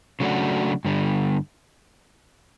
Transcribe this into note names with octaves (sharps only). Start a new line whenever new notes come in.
C#3 F#3 A3 D4 F#4
G2 D3 G3